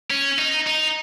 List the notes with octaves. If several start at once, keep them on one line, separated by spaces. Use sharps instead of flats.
C#4
D#4
D#4